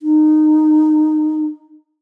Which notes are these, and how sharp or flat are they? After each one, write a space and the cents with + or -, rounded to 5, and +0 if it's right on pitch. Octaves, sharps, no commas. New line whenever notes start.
D#4 -20